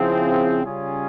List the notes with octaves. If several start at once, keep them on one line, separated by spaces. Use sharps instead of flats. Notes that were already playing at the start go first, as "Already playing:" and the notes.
Already playing: C#3 F3 C4 E4 G#4
C#3 G3 C#4 F4 G#4